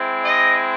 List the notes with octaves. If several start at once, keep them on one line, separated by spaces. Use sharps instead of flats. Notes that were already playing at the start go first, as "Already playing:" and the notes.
Already playing: G#3 C4 E4
D#5